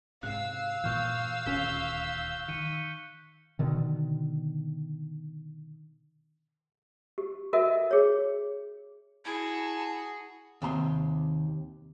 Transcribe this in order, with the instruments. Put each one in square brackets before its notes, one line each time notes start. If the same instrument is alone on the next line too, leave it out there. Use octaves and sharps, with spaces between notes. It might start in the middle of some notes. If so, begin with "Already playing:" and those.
[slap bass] G#2 C3 [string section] F5 E6 [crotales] F#6
[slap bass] G2 A#2 E3 [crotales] C#6 F6 G6
[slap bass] D#1 D2 C#4 [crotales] G6 B6 G7
[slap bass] D#3 [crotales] C#7 D#7
[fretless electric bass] B2 D3 D#3
[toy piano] G4
F#4 A4 A#4 D#5 E5
G#4 C#5
[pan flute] E4 [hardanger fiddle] F#4 G#4 [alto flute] A5
[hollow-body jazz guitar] D#2 C3 A#5 C6